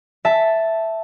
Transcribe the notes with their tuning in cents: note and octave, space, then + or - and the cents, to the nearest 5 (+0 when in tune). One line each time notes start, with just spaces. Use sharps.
E5 +0 A5 +0